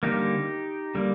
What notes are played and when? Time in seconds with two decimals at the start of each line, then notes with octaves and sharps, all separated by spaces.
0.03 D3 G3 A#3 D#4 G4
0.95 D3 G3 A#3